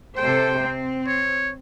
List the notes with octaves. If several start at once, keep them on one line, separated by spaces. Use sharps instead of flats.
C3 A4 C5 G5
C4
C#5